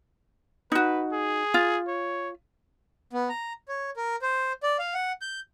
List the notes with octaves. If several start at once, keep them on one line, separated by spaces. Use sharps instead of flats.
D#4 F#4 B4
G#4
F4
C#5
B3
A#5
C#5
A#4
C5
D5
F5
F#5
G6